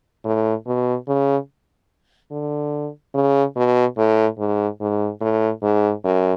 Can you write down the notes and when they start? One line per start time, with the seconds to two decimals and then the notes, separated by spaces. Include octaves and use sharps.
0.25 A2
0.67 B2
1.08 C#3
2.31 D3
3.14 C#3
3.56 B2
3.98 A2
4.39 G#2
4.81 G#2
5.21 A2
5.63 G#2
6.05 F#2